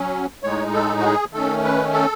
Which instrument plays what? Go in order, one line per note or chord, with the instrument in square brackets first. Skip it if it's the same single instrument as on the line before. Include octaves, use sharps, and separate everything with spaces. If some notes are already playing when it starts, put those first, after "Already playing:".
Already playing: [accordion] F#3 C#4
A2 G#3 D#4 C#5
A4
F#4
G#4
D#3 A3 C#4 A4
B4
A4